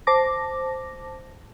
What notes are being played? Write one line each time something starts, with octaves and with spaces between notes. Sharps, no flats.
C5 A5 D6 A#6